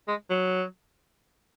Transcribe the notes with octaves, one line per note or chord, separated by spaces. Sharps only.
G#3
F#3